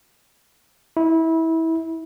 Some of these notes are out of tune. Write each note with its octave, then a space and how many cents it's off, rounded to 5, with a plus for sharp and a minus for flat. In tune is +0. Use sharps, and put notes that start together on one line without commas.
E4 -25